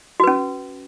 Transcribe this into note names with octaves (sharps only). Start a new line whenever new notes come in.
C#4 F#4 B4